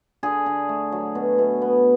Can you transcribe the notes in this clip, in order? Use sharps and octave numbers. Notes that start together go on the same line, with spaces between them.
D3 G#4
D3
A3
F#3
B2
B2
B3